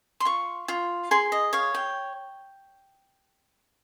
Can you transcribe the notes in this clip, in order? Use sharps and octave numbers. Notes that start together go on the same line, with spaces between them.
C6
F4 C#6
F4
G#4 C6
D#5
C#5 F5
G5